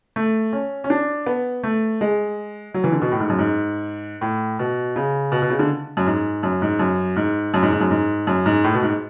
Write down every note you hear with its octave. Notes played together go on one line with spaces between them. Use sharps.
A3
C#4
C#4
D4
B3
A3
G#3
F#3
E3
D3
B2
A2
G#2
F#2
G#2
A2
B2
C#3
B2
B2
C#3
D3
F#2
G#2
F#2
G#2
F#2
G#2
F#2
G#2
G#2
F#2
G#2
F#2
G#2
A2
B2
G#2